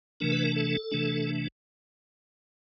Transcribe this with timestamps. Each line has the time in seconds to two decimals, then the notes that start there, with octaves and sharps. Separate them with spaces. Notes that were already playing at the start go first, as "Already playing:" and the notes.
0.20 C3 E3 A3 D4 A#4
0.32 B4
0.44 A#4
0.56 A4
0.91 C3 E3 A3 D4